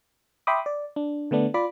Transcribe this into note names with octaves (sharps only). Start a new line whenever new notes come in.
E5 G5 B5 C6 D6 D#6
D5
D4
D3 A3 B3 D4
F4 D5 B5 D6